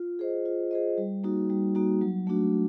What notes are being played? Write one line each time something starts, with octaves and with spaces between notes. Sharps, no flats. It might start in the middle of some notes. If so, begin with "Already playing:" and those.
Already playing: F4
G#4 C5 D#5
F4
G#4 C5 D#5
G3
A#3 D#4 F#4
G3
A#3 D#4 F#4
F#3
A3 D4 F#4